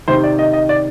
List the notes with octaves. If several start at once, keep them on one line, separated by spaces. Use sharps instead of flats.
C3 D#3 C5
D5
D#5
D#5
D5